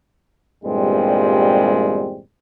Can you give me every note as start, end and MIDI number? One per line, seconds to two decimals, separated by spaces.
0.64 2.20 40
0.64 2.20 43
0.64 2.20 46
0.64 2.20 55
0.64 2.20 56
0.64 2.20 60